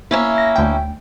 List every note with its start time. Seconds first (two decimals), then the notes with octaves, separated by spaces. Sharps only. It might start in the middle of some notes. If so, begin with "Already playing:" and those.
0.11 A#3 C#4 E4
0.38 A#6
0.56 D2 G5